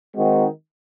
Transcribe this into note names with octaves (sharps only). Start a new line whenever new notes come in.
D#3 G#3 C4 D#4 F#4